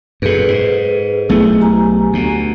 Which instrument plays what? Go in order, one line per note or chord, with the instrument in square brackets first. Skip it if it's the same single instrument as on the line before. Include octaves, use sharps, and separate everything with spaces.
[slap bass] F#2 A#2 [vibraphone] G#4 A4 B4
[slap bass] G#2
[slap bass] B1 A3 B3 [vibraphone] E4 G#4
[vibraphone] G4 G#5 A#5
[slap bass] D2 B2